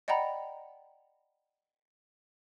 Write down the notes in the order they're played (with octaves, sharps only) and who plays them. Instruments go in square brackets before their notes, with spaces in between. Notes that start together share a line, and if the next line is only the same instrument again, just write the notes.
[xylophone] D5 D#5 F#5 G5 A#5 B5